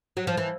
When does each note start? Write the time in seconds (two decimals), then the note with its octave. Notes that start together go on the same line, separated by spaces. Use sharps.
0.17 F#3
0.27 F3
0.37 E3